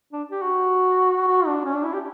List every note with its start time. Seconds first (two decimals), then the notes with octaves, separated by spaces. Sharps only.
0.12 D4
0.31 G4
0.41 F#4
1.27 F#4
1.46 D4
1.65 C#4
1.75 D4
1.84 E4
1.93 G4